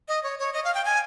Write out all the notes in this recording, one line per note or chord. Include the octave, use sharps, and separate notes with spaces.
D#5
C#5
C#5
D#5
F5
G5
G#5